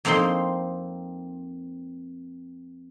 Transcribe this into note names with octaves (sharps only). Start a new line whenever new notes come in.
F2 A#3 C4 D#4 C6